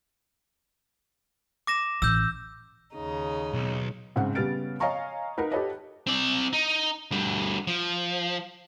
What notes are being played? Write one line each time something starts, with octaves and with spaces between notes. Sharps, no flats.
D6 A#6 E7
A1 E6 G6
D#2 C#3 D#4
B1
G#2 C#3 C4 F#5
C#3 G3 B3 F6 A6 D7
C#5 D#5 F5 G#5 A#5 C#6
D#4 A#4 B4 F#5
G4 A4 B4 C#5 D#5
C4 D5
D#4
D2 G3
F3